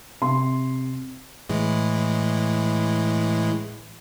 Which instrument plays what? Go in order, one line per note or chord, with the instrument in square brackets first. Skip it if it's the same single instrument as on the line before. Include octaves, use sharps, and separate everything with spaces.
[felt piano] C3 C6
[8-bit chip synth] A2 E3 G#3